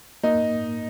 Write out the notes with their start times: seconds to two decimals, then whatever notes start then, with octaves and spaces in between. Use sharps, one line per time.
0.23 A#3 D#4